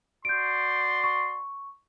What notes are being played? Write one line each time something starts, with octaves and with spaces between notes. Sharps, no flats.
F#4 D5 C6 G6 D7
C#6